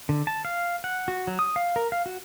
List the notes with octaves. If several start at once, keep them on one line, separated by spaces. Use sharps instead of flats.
D3
A5
F5
F#5
F#4
F#3
D#6
F5
A#4
F5
F#4